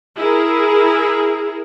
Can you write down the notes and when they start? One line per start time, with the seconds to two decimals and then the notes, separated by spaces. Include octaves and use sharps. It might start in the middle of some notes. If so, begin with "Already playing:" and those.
0.17 E4 G#4 A#4